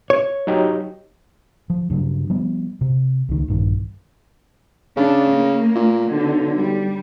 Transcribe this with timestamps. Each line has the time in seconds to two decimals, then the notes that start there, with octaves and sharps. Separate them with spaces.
0.10 C#5
0.47 F#3 D#4 G4
1.70 F3
1.90 G2 C#3 F#3
2.30 F3 G3 B3
2.81 C3
3.29 C#2 D#3
3.48 A#1 G2 D#3
4.97 C#3 D4
5.33 A#3
5.75 A#2
6.12 B1 D3
6.57 G3